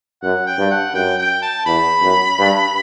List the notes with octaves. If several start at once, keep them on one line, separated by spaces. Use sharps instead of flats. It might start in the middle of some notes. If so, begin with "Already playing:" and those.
F#2 F#5
G5
G2
F#5
F#2 G5
G5
A5
E2 B5
F#2
G2